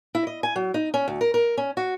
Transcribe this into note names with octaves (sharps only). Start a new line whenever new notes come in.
E4
D#5
G#5
F#3
D#4
C#4
D2
A#4
A#4
C#4
F#4